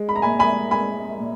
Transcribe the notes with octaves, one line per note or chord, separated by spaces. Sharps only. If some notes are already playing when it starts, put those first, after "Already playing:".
Already playing: G#3
B5
A#5
A#2 G#5 B5
G#5 B5
G#3 G#5 B5
A#2